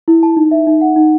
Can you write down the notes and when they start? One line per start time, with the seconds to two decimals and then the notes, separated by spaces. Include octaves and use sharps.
0.08 E4
0.23 A5
0.37 D#4
0.51 E5
0.67 D#4
0.81 F#5
0.96 D#4